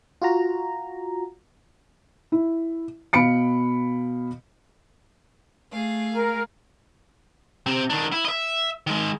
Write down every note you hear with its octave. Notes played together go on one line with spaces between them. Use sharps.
F4 F#4 A#5
E4
B2 F5 B5 C#7 D7
A3 G#4 F5
A#4
C3 C4
D#3 D4
E4
D#5 E5
D#3 G#3